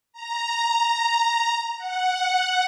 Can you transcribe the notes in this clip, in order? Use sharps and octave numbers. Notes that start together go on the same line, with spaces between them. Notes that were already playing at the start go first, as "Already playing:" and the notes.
A#5
F#5